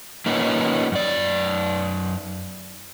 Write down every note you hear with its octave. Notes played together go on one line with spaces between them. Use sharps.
A#3 C#4 D#4 F4 B4
F#2 D5